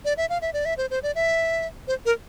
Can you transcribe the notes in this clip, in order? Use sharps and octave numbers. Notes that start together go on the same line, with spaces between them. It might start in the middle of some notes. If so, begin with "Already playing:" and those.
D5
E5
F5
E5
D5
E5
C5
C5
D5
E5
C5
A#4